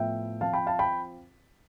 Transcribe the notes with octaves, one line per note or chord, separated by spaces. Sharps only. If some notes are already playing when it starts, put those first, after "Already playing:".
Already playing: A2 F3 B3 E4 E5 G5
F3 C4 F4 F5 A5
G5 B5
F5 A5
G5 B5